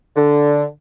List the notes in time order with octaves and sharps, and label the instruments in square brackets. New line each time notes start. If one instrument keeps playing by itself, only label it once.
[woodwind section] D3